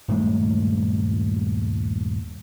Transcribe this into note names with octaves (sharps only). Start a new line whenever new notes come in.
D#1 G2 G#3 A3